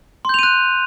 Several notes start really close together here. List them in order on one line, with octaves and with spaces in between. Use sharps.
C6 G6 F7 D#7 F#6